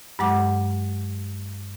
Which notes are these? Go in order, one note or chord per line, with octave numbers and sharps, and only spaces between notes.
G2 F#3 G#3 F#5 D6